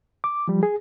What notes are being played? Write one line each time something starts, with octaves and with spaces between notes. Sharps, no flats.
D6
F3 G3
G#4